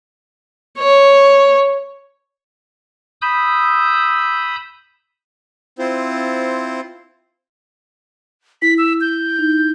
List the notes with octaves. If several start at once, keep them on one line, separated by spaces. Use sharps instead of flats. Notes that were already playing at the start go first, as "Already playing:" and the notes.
C#5
B5 D#6 E6 G6
C4 E4 F4 C5
E4 B6
E6
G6
D#4